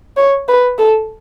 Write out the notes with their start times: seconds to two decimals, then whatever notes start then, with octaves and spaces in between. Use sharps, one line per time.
0.17 C#5
0.49 B4
0.78 A4